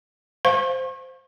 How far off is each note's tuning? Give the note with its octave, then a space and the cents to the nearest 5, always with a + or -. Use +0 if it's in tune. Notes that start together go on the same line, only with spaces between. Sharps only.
C5 +0 C#6 -40